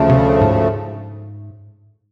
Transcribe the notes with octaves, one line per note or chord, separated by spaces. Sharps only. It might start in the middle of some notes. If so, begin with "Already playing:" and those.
Already playing: D2 C#3 F3 A3
C3
G#2